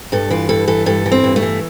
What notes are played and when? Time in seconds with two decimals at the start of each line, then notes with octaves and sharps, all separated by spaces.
0.12 G2 A4
0.30 E3 F4
0.49 G2 A4
0.68 E3 A4
0.86 G2 A4
1.06 E3
1.12 C4
1.24 G2
1.36 A3
1.42 E3